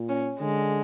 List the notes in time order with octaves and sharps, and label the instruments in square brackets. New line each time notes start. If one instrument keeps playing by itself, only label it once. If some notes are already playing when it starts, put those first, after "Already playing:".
Already playing: [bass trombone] A#2
[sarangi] C#4
[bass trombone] D3 [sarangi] G#3